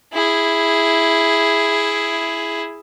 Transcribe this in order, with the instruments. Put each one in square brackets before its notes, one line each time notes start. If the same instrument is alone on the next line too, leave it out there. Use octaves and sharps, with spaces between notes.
[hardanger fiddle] E4 G#4